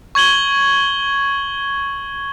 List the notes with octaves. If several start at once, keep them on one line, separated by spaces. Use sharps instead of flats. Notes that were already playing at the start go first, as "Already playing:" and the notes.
C#6 G#6 F#7 G7